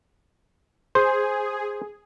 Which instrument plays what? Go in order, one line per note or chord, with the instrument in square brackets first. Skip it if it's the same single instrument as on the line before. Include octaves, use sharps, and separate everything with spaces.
[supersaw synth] G#4 [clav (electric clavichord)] C5